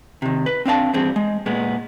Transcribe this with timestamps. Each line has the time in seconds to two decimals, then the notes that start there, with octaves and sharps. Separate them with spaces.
0.22 C3 D#3
0.46 B4
0.65 C4 D4 F5 A5
0.93 E2 G2 C4 G#4
1.16 G#3
1.46 A#2 G#3 B3